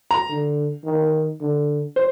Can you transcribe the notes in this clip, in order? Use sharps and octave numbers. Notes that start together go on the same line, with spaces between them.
A#5
D3
D#3
D3
C5